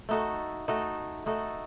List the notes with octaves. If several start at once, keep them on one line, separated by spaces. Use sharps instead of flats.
A3 D#4 F#4 A4
A3 D#4 F#4 A4
A3 D#4 F#4 A4